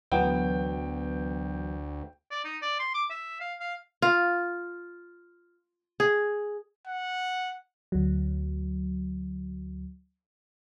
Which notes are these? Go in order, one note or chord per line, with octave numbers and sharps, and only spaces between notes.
D2 E3 F#3 B3 G5
D5
D#4
D5
C6
D6
E5
F5
F5
F4
G#4
F#5
D2 F#3